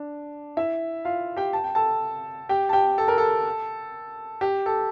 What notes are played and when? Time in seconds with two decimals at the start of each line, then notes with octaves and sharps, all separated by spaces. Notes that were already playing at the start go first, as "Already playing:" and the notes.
Already playing: D4
0.57 E4 E5
1.05 F4 F5
1.37 G4 G5
1.53 A5
1.64 G5
1.75 A4 A5
2.49 G4 G5
2.69 A5
2.73 G4 G5
2.98 A4
3.08 A#4
3.18 A4
4.41 G4
4.66 A4